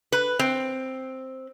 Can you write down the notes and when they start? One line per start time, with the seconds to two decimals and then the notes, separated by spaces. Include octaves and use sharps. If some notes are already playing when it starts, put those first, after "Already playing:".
0.12 B4
0.39 C4